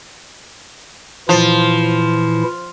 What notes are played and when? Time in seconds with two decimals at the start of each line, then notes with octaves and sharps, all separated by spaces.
1.29 A#2 E3 F3 E4